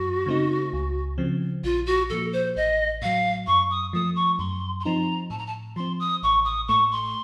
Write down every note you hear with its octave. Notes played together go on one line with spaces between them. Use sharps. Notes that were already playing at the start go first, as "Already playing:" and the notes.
Already playing: F#2 F#4
C#3 A3 C4 D#4
C#2
C#3 F3 C4
A#1 F4
F#4
A#2 F3 A#3 A4
C5
A1 D#5
A2 F#3 F5
F#2 C#6
D#6
F3 A3 D#6
C#6
F#2 C6
C6
F3 C4 D#4 A#5
A2 A5
A#5
A5
F3 C4 C6
D#6
A1 C#6
D#6
A2 A3 C#6
C6